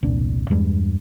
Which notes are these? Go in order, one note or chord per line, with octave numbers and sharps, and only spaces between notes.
E1 C2 A#2 D4
E2 G2 G#3